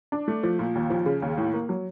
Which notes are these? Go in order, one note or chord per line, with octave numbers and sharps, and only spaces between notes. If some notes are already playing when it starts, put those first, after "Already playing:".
D4
A3
F3
A#2
D#2
F3
C#3
D#2
A2
A#3
F#3